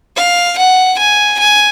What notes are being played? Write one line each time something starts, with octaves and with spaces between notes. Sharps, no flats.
F5
F#5
G#5
G#5